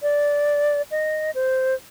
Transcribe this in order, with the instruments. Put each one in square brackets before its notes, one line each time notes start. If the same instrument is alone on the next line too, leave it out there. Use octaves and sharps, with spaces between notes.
[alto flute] D5
D#5
C5